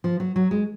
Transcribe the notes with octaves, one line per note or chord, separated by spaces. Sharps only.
F3
F#3
F#3
G#3